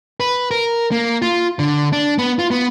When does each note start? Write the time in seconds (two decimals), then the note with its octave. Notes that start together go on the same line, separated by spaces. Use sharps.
0.20 B4
0.51 A#4
0.92 A#3
1.22 F4
1.59 D3
1.92 D4
2.19 B3
2.39 F4
2.51 B3